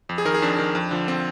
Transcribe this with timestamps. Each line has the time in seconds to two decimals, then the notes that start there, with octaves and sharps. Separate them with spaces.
0.09 F2
0.18 G#4
0.25 D#3 A#4
0.34 G#4
0.42 F2 D4
0.59 D#3
0.75 F2
0.91 D3 F3
1.08 C4